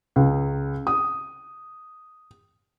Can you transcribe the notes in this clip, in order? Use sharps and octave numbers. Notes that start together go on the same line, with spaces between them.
C#2
D#6